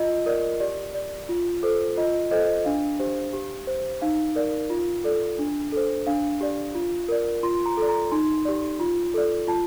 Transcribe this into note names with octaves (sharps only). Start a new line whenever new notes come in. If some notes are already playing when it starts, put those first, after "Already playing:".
Already playing: F4 D#5
A#4 D5
G4 D5
D5
F4
A4 C5
F4 D#5
A4 C5 D#5
D4 F5
G4 C5
G4
C5
D#4 F5
A#4 D5
F4
A4 D5
D4
A4 C5
D4 F5
G4 D5
F4
A#4 D5
F4 C6
A#5
A4 D5
A#5
D#4 C6
G4 D5
F4
A4 D5
F4 A5